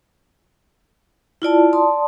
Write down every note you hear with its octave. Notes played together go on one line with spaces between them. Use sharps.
E4 F4 D5 A5
D5 A5 C6 D#6